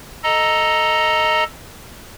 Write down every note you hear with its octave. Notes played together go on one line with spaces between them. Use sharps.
A4 D#5 A#5